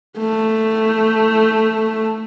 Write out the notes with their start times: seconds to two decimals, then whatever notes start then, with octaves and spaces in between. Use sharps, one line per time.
0.18 A3